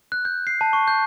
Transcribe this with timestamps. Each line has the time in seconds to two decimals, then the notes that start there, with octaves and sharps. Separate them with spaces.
0.12 F#6
0.25 G6
0.47 C7
0.61 A5
0.73 C#6
0.88 G6